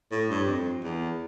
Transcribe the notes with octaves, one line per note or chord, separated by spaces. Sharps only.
A2
G2
F2
E2